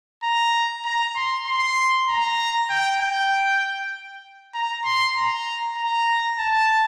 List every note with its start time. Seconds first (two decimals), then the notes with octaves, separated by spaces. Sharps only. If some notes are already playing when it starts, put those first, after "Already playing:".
0.23 A#5
0.85 A#5
1.16 C6
1.47 C6
2.08 A#5
2.70 G5
3.01 G5
4.54 A#5
4.85 C6
5.16 A#5
5.77 A#5
6.39 A5